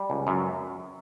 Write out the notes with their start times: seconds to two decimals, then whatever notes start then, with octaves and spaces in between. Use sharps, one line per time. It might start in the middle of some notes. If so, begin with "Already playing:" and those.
Already playing: G3
0.10 C#2
0.27 F#2